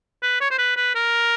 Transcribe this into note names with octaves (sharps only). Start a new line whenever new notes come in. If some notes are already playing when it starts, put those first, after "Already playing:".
B4
C#5
C5
B4
B4
A#4